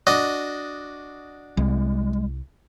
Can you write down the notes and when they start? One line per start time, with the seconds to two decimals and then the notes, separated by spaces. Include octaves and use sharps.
0.07 D4 F#4 D#5
1.57 C2 G3 G#3